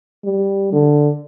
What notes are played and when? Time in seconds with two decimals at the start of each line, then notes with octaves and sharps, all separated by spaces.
0.24 G3
0.72 D3